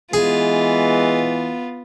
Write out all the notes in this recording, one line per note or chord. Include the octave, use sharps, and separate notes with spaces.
E3 G#3 B3 F4 G#4